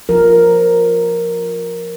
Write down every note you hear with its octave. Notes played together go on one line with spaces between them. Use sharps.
F3 A#4